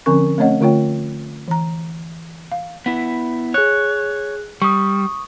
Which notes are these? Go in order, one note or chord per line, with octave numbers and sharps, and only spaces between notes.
D3 F3 C4 C#4 A#4 C#6
A3 C4 C#4 C#5 D#5 F#5
D3 A3 F4 C#5 G5
E3 A#5
F5
B3 E4
G#4 C#5 F#6
G3 C#6 D#6